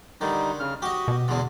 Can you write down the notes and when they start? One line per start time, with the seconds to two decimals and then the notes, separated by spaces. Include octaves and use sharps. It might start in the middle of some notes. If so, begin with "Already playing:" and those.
0.21 D3 D#3 G3 D#4
0.60 C#3 F6
0.82 F#4 G4 D#5
1.08 B2
1.28 E2 D3 G#3